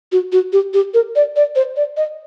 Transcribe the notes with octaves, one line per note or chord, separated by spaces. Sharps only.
F#4
F#4
G4
G4
A#4
D5
D5
C5
D5
D#5